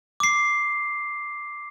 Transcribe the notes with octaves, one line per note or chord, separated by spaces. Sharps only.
D6 C7